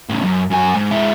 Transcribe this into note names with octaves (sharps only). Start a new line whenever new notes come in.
A2 C#3
F#2
F#2 G#5
G#2
G#3 E4